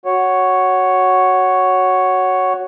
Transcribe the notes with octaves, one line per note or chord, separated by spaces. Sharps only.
F#4 C#5